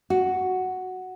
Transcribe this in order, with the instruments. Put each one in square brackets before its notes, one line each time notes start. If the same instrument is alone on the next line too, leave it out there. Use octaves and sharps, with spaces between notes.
[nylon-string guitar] F#4